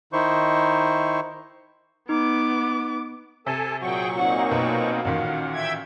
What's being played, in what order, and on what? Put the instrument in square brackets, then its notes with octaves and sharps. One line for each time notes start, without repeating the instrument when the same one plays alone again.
[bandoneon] D#3 D#4 E4 C5 C#6
[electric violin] B3 D6 [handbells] D#4
[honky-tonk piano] C3 [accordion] A4 G#5 A5
[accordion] A#2 F#3 C#6 [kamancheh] F#4 [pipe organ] G#4 G5
[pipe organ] A#3 C4 D#4 [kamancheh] F#4 F#5
[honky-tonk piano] B2 [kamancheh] F#4 F5
[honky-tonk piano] A1 A#2 D#3 [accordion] F#5
[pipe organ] E5 G5 G#6